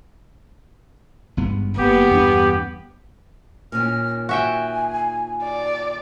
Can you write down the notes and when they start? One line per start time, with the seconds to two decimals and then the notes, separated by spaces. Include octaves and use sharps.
1.37 G#1 G2 B3
1.78 F#1 A#3 B3 G4
2.11 E2 G2 D4
3.72 A#2 D#3 C#4 F6
4.29 F#4 E5 G5 G#5
5.43 D5